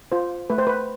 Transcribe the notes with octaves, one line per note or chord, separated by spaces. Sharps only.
F4 C5
A3 B4
C5
B4